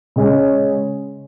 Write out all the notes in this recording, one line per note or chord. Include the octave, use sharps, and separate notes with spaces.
C#3 G#3 C#4